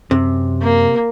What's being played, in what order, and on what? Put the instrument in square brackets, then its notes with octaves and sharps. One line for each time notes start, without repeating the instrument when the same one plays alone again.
[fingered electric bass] F#2 [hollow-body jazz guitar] C3
[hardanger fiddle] A#3